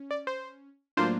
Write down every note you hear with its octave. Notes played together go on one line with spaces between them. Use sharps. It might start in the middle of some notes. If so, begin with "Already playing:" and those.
Already playing: C#4
D5
C5
A2 F#3 A#3 D4 F4 C5